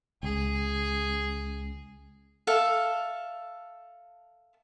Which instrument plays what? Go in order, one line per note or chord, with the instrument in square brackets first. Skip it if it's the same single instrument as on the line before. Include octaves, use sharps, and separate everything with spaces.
[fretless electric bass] C#2 [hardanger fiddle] G#4
[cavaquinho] A4 E5 F5